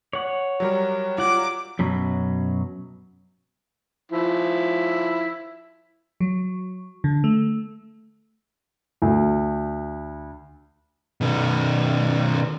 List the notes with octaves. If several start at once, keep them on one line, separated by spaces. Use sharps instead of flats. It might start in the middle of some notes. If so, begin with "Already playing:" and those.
C#5 F#5
F#3 G3 A#4
F4 F#5 D6
F#2 B2 F#3
F3 E4
F#3
D3
A3
D2
B2 D#3